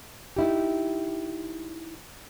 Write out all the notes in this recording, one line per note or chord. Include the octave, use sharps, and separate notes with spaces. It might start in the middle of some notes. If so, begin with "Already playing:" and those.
D#4 E4 G4